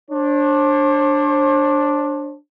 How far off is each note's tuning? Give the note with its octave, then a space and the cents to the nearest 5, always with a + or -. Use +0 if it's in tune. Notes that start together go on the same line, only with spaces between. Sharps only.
D4 +0 C5 +45